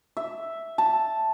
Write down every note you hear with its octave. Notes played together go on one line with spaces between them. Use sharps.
E5
A5